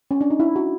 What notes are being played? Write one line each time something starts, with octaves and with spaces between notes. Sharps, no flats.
C#4
D4
D#4
E4
F#4